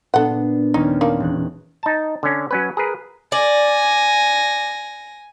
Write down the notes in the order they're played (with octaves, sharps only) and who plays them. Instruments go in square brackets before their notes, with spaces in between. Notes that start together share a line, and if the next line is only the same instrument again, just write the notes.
[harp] A#2 B3 D4 [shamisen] A4 F#5
[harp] D#2 C#4 [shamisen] D#4
[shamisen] A#3 D4 D#4
[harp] E1 F#6
[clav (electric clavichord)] D#4 A5
D3 C#4
F#3 C#4 B4
G#4 A#4 B4
[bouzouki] D5 [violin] G#5 A#6